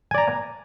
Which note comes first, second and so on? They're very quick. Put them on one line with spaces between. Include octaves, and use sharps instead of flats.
G#5 D5 A#5